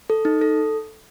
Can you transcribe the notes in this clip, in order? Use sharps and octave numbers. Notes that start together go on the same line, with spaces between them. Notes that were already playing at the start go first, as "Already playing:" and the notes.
A4
D#4
A4